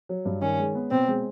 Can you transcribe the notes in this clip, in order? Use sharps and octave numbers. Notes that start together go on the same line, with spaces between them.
F#3
G2
D#3 C#4
G#3
B3
B2 C4
G#3